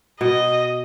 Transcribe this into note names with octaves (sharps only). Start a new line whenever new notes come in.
B2 D#5